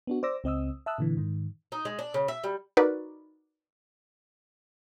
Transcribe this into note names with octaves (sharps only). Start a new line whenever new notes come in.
B3 D4 F#4
C5 D5 D6 E6 A#6
C#2 C4 D#5 D#6 E6
E5 A5 D#6 E6 F#6
A#2 D3 E3
G#2 D#3
D#4
G#3
D4
C#3
E5
G3
D#4 F#4 A#4 B4 D5